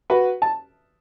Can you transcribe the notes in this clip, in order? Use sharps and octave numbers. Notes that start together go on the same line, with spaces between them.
F#4 B4
A5